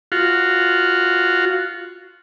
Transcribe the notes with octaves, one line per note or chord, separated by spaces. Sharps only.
F4 F#4